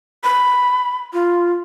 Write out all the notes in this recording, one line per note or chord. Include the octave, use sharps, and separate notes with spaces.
B5
F4